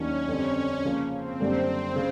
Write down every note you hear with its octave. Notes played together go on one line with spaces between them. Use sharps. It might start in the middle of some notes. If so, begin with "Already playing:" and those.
Already playing: D#2 D#3 F#3 A#3 C#4 D4
F2 D3 G3 C4 C#4
C#3 F3 A#3
C4
F#2 D3 G3 A#3
C4
C#3